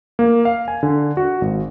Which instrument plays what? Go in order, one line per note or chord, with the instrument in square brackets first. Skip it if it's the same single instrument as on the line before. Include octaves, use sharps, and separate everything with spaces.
[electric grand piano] A#3
F5
G#5
D3
F#4
G#1